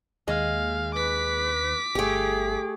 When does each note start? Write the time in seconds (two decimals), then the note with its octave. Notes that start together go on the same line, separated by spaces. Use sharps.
0.28 D#2 G#3 F5
0.94 B4 D6 B6
1.95 G1 A3 G4 G#4